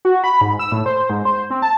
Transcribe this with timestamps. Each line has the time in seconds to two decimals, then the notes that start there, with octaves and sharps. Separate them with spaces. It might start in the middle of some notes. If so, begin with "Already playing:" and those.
0.05 F#4
0.24 B5
0.41 G#2
0.59 E6
0.72 A2
0.86 C5
1.10 G#2
1.25 C5
1.50 C4
1.62 A5